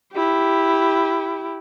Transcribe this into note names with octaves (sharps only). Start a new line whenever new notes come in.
E4 G4